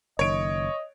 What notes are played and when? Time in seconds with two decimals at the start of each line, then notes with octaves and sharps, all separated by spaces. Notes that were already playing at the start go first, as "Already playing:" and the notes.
0.19 F#1 D#3 C#5 D#5 D7